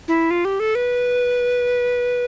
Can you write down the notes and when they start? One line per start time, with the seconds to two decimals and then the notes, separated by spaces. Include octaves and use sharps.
0.08 E4
0.31 F4
0.45 G4
0.60 A4
0.75 B4